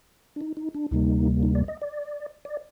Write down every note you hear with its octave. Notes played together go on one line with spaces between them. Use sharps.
D4
D#4
D#4
D4
D2 C3 G3 A#3 D#4
D#4
D5
D#5
D5
D5